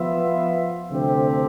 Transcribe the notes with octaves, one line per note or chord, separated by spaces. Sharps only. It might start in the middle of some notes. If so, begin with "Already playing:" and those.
Already playing: F3 B3 F4 B4 E5
D2 C3 F3 C4 G4